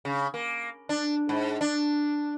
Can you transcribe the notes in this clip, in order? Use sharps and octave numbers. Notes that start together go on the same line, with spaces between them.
C#3
A#3
D4
G#2
D4